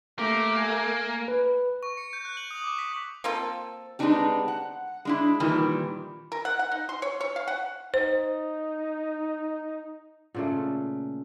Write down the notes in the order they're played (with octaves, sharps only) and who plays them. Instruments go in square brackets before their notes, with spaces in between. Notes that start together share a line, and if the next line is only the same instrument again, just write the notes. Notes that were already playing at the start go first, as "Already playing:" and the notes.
[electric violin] A3 [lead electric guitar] A#3 [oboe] G4
[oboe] G#5
[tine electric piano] B4
[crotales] C#6
C#7
G6
F#6
F#7
D#6
D6
B6
[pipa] A#3 C4 F4 A4
[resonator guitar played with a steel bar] G#3 B3 C4 D4 D#4 G4
F#5
G#3 D4 E4
A#2 D#3 E3 G3
[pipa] A#4
F#5
F#5
D#4
C6
C#5
C#5
F5
F#5
[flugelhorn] D#4 [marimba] C5
[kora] A#2 C#3 A3